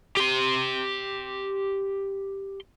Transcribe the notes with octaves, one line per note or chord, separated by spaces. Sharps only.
G4 C6